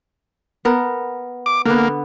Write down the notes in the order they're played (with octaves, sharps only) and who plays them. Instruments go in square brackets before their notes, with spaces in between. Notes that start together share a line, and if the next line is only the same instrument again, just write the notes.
[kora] B3 A#4
[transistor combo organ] D6
[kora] D3 B3 [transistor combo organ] A#3